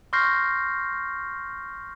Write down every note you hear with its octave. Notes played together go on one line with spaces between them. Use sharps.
C6 C#6 F6 G6 A#6 C7